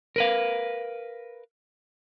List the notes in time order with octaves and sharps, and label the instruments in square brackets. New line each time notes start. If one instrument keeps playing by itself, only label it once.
[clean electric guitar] A#4 B4 F5